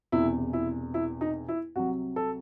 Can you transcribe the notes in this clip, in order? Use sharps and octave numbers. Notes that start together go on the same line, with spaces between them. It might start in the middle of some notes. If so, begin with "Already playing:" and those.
E1 E2 C3 E4
E4
E4
D#4
E4
C2 C3 F#3 F#4
A4